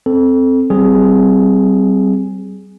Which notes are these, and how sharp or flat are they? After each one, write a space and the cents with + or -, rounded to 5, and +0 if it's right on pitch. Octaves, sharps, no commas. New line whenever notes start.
C4 +0 A4 +0
G3 -25 C4 +0 G#4 +0